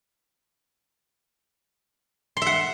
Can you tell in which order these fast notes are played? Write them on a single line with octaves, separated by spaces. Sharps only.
C6 E5 F#5